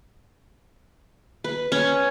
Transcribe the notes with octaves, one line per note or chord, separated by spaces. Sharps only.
B4
C#4